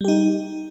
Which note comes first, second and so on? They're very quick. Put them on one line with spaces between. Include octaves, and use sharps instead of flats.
G3 G4 D#4